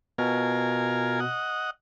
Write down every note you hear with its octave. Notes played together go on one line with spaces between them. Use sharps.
B2 F4 A#4 G#5
D#5 F#5